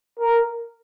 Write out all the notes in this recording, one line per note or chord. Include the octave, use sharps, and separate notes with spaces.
A#4